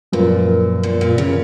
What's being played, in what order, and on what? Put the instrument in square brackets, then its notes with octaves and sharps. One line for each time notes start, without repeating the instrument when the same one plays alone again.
[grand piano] F#2 F3 A#3 F4 B4 [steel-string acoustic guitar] A#2
[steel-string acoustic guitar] A#2
A#2
C#3